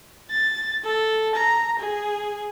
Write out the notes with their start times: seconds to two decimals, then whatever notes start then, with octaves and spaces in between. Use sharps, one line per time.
0.30 A6
0.84 A4
1.35 A#5
1.79 G#4